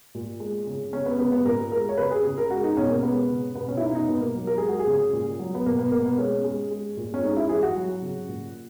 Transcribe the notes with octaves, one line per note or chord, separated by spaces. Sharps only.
A#2
G#3
C#3
C#3 C#4
B3
C#3 B3
B3
A#2 A#4
G#3 A#4
C#5
C#3 B4
G#4
C#3
A#4
G#3 F#4
D#4
B2 C#4
A#3
G#3 B3
C#3
B2 B3
C#4
E4
B2 D#4
D#4
B2 B3
A#3
F#3
A#4
G#3 G#4
F#4
G#4
C#3
A#2
F#3
B3
B2 A#3
B3
B2 A#3
B3
G#3 C#4
G#3
G#3
A#2
C#4
G#3 D#4
E4
E3 G#4
F#4
F#3
C#3
A#2